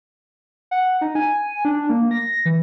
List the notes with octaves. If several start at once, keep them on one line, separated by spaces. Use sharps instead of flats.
F#5
D#4
G#5
D4
A#3
A#6
E3